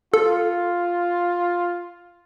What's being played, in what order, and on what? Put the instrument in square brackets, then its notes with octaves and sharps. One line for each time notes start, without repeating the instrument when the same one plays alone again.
[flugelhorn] F4 [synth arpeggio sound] A4